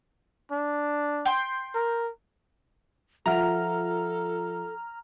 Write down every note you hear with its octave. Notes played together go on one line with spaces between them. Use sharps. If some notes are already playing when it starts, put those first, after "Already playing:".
D4
G5 C6
A#4
F3 F4 A4 E5 F#5 A#5 F6